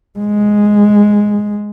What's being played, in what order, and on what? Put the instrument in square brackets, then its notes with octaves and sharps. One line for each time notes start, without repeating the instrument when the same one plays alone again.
[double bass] G#3